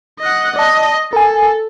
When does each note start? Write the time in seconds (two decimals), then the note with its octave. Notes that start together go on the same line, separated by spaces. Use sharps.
0.20 D#5 F#5
0.56 D5 D#5 A5
1.13 A4 A#4 G#5